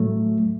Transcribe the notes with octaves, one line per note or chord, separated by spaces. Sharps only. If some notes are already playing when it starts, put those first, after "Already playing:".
Already playing: A2 F#3 A3